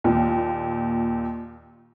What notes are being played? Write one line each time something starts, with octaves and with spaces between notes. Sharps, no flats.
D#2 A#2